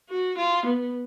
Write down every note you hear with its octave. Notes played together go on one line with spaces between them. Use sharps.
F#4
F4
B3